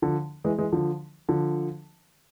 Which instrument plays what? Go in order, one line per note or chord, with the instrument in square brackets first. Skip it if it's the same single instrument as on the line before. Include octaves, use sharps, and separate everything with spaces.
[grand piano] D3 F3
E3 G#3
E3 G#3
D3 F3
D3 F3